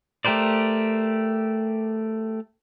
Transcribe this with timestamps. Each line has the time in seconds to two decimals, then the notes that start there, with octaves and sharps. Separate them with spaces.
0.25 A3 G4 A#4 C5 D5